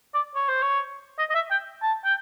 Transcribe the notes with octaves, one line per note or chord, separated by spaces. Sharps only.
D5
C#5
C5
C#5
D#5
D#5
E5
G5
A5
G5